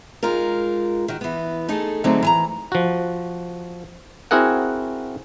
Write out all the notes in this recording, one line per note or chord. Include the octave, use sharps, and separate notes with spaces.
G#3 D#4 F4 A#4
D#3 F#4
E3 B3
A3 D#4 G#4 A4
D3 F#3 G#3 A3 C4 D#4
E3 G#5 A#5
F3 F#4
C4 E4 F#4 G#4 A#4 F#5